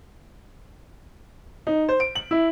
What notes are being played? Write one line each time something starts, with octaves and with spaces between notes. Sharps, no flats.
D#4
C5
D7
F#7
E4